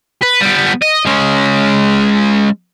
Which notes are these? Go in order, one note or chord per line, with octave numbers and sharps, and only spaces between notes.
B4
G3 B3
D#5
G#3 C#4